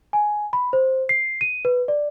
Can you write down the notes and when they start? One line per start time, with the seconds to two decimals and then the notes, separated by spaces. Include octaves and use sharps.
0.13 G#5
0.53 B5
0.73 C5
1.09 C7
1.41 D#7
1.65 B4
1.88 D5